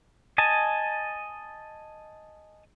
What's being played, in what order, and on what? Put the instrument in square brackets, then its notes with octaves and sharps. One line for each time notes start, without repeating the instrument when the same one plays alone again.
[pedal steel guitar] D#5 G#5 A5